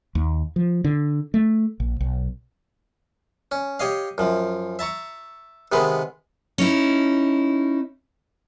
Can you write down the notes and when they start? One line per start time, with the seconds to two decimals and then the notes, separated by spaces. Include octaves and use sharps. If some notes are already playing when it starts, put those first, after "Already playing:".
0.15 D#2
0.56 F3
0.85 D3
1.34 A3
1.80 A#1
2.01 B1
3.52 C#4
3.80 G4 C#5 D#5 F5
4.18 F#2 F3
4.79 E5 A5 A#5 C#6
5.72 C3 D#3 G#3 B3 B4
6.58 C#4 D#4 E4